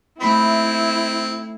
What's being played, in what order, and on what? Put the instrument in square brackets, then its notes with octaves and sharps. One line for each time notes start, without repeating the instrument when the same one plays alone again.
[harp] A3 D#4 B5 [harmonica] C4 [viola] E4